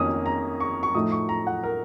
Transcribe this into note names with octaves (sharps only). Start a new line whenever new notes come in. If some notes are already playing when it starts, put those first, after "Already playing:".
Already playing: F2 D#3 A#3 C#4 D#6
A#5
C#6
C#6
A2 F3 A3 D#4 D#6
C#6
A#5
F#5
A#4